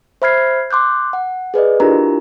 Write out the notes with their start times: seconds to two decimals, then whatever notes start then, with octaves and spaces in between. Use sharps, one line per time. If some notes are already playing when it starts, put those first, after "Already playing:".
0.22 C5 E5 B5 F6 G#6 C7
0.71 C6 D6 F#6 G6
1.13 F#5
1.54 G#4 B4 D5 D#5
1.80 D4 E4 F4 G4 A#4 A#5